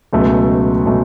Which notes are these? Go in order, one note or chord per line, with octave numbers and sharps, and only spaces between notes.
C#2 B2 F#3 A3
B2 F#3 A3